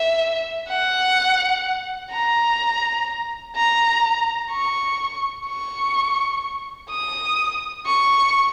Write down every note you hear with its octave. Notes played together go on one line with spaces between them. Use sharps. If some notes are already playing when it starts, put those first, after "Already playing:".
Already playing: E5
F#5
A#5
A#5
C#6
C#6
D#6
C#6